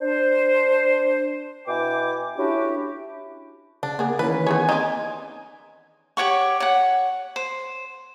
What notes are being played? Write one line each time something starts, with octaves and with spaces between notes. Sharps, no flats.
D4 C5
B2 E4 G5 G#5 D6
A3 C#4 D4 E4 F#4 G4
C#3 D4
A#3 B3 G#4
D#3 E3 C#4 B4
B3 G#4 C#5 G#5
C4 D#4 D5 G#6
G4 C#5 F#5 C#6
C#5 F#5
C5